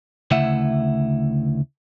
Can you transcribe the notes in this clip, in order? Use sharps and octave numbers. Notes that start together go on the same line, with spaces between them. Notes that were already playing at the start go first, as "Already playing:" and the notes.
D2 C#3 A3 E4 E5 F#5